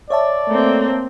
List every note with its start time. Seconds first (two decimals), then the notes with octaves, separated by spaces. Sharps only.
0.10 C#5 D5 E5 A5
0.49 A3 A#3 C4